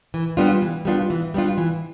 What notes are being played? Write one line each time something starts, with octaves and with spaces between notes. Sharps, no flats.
E3
G3 B3 D4 F4
E3
G3 B3 D4 F4
E3
G3 B3 D4 F4
E3